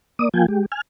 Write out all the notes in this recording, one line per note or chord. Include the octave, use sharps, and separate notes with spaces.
A#3 D5 D#6
F3 A#3 F4 G5 G#5
G#3 G4
G#5 F6